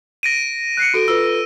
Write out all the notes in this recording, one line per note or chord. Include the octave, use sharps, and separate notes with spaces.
A#6 D7 D#7
F#6 C7 C#7
F#4 A4 D7
F4 A4 B4 E6